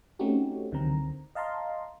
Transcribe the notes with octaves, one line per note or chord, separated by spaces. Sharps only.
A3 C4 C#4 D#4 F#4 G4
C#2 D3 D#3 F#3 C4 A#5
D#5 F5 A5 A#5 C6